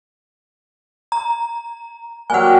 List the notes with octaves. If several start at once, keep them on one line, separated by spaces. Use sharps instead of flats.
A#5
F#3 G3 A#3 F#5 G#5